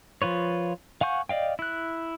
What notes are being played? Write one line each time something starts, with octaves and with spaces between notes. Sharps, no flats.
F3 F4 B4 C#5
F5 F#5 G#5 C#6 G6
D5 D#5 F5 G5
E4 F#6